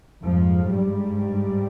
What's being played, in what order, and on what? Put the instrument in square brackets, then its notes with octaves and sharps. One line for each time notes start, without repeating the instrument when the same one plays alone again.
[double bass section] F2 G#2 F3
G2 G3